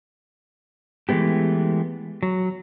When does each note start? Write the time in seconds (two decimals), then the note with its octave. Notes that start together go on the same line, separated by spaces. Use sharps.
1.09 E3 G#3 A3 B3 G4
2.23 F#3